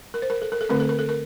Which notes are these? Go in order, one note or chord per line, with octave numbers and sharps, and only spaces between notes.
A#4
C5
A#4
A4
A#4
A4
D3 A3 C4 A#4
A4
A#4
A4
A#4